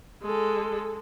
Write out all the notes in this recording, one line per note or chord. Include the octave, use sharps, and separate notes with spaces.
G#3 A4